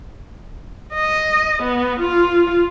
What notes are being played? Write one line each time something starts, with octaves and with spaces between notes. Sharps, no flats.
D#5
B3
F4